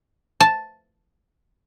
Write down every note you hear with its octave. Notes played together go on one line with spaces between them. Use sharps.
A5